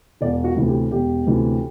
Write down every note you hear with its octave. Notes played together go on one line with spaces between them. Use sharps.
E1 D5
F#4
D2 C3 E3
G4
E1 G4
D2 C3 E3